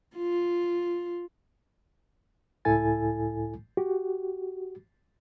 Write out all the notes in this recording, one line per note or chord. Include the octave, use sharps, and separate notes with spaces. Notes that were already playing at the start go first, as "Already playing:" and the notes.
F4
C#2 A2 E4 A4 G#5 A6
F#4 G4